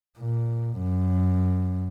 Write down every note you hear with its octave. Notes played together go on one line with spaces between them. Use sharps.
A#2
F#2